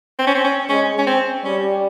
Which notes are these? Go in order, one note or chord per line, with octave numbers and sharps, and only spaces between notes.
C4
C#4
C4
C#4
G#3 C#4
C#4
C4
G3 C#4